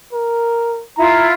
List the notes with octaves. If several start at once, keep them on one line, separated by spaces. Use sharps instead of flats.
A#4
E4 F4 A#5